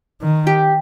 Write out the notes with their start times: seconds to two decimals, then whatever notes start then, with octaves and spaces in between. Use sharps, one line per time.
0.22 D#3
0.47 G4